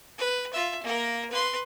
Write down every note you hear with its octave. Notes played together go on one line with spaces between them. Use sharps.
B4
F4 E5
A#3 A#4
B4 C6